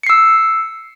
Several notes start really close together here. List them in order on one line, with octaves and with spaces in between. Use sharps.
C#7 C7 E6